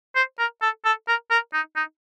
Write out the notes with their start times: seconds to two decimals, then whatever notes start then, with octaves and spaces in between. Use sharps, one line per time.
0.16 C5
0.39 A#4
0.62 A4
0.85 A4
1.08 A#4
1.31 A#4
1.54 D#4
1.76 D#4